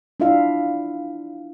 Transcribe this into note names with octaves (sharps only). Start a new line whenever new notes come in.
D4 E4 F4 E5 F5